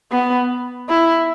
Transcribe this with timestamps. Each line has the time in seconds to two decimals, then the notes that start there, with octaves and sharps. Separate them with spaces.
0.11 B3
0.89 E4